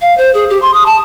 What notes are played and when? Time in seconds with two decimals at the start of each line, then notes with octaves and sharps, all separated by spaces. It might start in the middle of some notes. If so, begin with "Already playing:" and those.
0.01 F5
0.18 C5
0.34 G#4
0.50 G4
0.62 C6
0.74 D#6
0.86 A5